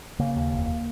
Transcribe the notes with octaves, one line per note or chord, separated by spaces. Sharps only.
C#3 A#3
D#2
F1